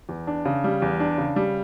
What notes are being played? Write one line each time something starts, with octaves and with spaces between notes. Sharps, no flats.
E2
D4
C#3
G3
E2
D4
C#3
G3